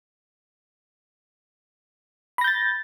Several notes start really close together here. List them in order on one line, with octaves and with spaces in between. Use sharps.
B5 A#6 G6 A6